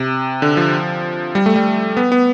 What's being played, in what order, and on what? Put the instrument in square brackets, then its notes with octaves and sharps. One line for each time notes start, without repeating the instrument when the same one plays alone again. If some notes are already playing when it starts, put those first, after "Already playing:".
Already playing: [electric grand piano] C3
D3
F3
G3
A3
G3
B3
B3